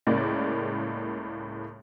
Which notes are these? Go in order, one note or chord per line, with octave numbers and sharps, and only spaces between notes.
C#2 A2 G#3 A#3 D5